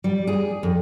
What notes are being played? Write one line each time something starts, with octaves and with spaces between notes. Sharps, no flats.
G3
G#4
F2